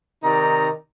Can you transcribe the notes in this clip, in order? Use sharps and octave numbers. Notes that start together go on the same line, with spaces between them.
C3 D#3 D#4 D5 A#5